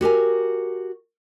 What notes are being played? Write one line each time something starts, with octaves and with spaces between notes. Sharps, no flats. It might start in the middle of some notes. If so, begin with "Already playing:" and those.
F#4 G4 A#4 G#5